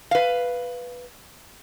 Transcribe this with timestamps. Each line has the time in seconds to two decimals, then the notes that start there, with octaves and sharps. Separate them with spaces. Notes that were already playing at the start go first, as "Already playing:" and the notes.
0.11 B4 F5